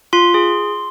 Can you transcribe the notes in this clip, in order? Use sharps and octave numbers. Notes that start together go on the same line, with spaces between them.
F4 C6
G#4